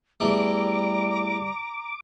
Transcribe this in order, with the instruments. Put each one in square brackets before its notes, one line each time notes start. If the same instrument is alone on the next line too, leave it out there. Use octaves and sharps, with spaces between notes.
[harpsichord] E2 A3 [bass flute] G3 [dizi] A#5 [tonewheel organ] D6